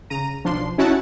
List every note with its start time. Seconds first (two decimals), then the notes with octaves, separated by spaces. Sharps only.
0.10 C#3 A#5 D#7
0.44 B1 F3 D4 C6
0.78 C#4 D#4 E4 F#4 F#5 A5